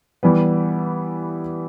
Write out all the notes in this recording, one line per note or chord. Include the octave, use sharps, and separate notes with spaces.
E3 G3 B3